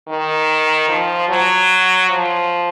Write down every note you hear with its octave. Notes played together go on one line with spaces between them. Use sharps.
D#3
F3
F#3
F3